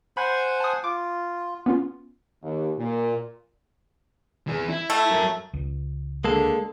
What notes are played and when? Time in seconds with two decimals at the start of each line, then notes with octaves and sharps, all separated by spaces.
0.17 C5 F#5 G#5 B5
0.60 A5 D#6
0.84 F4 D6
1.66 B3 C#4 F4
2.43 D#2
2.77 A#2
4.47 E3 G#4
4.69 E4
4.90 A3
5.11 F#3 A#4
5.53 C#2
6.24 D3 G#3 A#3 A4